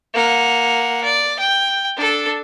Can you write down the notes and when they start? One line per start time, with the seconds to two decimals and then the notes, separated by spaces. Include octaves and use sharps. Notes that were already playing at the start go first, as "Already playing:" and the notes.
0.14 A#3 F#5
1.04 D5
1.39 G5
1.96 D4 A4